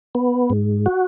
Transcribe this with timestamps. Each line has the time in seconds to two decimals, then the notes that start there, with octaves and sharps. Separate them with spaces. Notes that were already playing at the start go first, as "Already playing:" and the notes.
0.15 B3
0.50 G#2
0.86 F#4